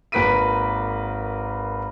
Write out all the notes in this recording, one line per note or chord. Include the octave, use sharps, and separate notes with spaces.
G#1 A#3 B4 B6 D7 D#7